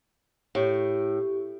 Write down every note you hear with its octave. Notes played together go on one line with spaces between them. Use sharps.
A2 G4 C#6